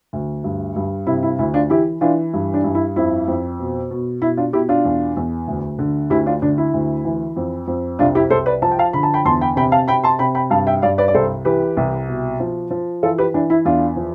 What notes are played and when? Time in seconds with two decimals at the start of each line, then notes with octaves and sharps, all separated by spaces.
0.13 D2
0.44 G2
0.76 G2
1.07 C3 E4
1.23 E4
1.39 D2 E4
1.54 D4 F4
1.70 E3 E4 G4
2.01 E3 D4 F4
2.34 G2
2.54 D4
2.64 G2
2.75 E4
2.96 F2 E4
3.27 F2
3.59 B2
3.91 B2
4.21 B2 E4
4.37 D4 F4
4.53 B2 E4 G4
4.69 D4 F4
4.85 E2
5.17 E2
5.48 D2
5.79 D3
6.10 D2 E4 G4
6.26 D4 F4
6.42 D3 D4
6.58 E4
6.74 D2
7.05 E3
7.36 F2
7.67 F2
7.99 C2 D4 F4
8.15 E4 G4
8.30 C2 A4 C5
8.46 B4 D5
8.62 F3 A5
8.71 G5
8.79 F5 A5
8.93 D3 B5
9.03 A5
9.14 G5 B5
9.25 E2 A5 C6
9.41 G5 B5
9.56 C3 G5 B5
9.72 F5 A5
9.88 C3 G5 B5
10.03 A5 C6
10.19 C3 G5 B5
10.35 G5 B5
10.50 G2 F5 A5
10.67 E5 G5
10.82 G2 D5 F5
10.98 B4 D5
11.08 D5
11.14 C2 A4 C5
11.45 E3 G4 B4
11.77 C2
12.08 B2
12.40 F3
12.71 F3
13.03 E3 F4 A4
13.18 G4 B4
13.34 E3 D4
13.50 E4
13.65 E2 D4 F4
13.96 F3